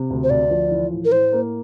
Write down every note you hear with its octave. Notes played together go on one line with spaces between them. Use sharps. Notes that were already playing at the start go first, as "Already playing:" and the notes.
Already playing: C3
D2
C5
D2 D5
F3
E3
A2
A#4
A2 C5
A#3